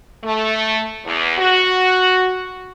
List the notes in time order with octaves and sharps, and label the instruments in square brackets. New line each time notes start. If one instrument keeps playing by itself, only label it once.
[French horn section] A3
E2
F#4